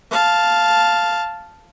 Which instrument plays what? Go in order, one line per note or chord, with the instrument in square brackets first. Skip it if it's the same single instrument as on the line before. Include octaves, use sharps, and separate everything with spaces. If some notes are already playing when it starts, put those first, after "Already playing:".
[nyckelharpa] F5 A5